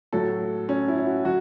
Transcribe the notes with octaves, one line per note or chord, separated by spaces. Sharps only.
A2 F#3 A4
C#4
E4
E4
F#4
F#3 F#4